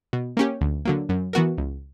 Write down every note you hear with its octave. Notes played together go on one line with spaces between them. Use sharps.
B2
A#3 C#4 G4
D2
D3 F#3 A#3
F#2
E3 B3 F#4 A#4
C#2